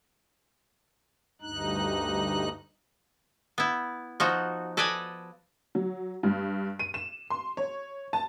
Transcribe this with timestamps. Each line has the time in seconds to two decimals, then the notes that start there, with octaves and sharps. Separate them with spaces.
1.42 D2 G2 D#4 F#6
3.58 B3 E4
4.20 F3 D#4 F#4
4.77 A4 B4 D5 D#5 G#5
5.75 F#3
6.23 G2
6.79 D#7
6.94 E7
7.30 C6
7.57 C#5
8.13 A5